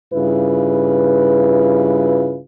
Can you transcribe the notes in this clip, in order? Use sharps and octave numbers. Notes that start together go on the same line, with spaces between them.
G2 C#3 E4 F4 B4